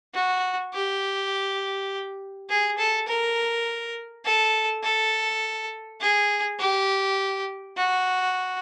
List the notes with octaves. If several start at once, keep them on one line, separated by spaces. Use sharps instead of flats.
F#4
G4
G#4
A4
A#4
A4
A4
G#4
G4
F#4